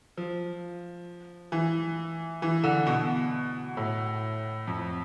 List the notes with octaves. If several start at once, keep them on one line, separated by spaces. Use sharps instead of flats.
F3
E3
E3
D3
B2
A2
F2